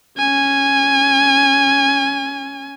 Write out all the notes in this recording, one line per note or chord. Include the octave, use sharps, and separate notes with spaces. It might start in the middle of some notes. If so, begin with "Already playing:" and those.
C#4 G#5